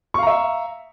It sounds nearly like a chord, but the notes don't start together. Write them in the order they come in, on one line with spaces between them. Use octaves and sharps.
C#6 F5 A#5 E5